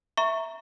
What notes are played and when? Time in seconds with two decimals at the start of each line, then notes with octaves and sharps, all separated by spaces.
0.17 E5 A#5 C#6